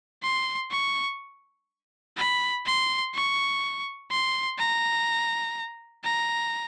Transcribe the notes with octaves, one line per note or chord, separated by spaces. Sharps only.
C6
C#6
B5
C6
C#6
C6
A#5
A#5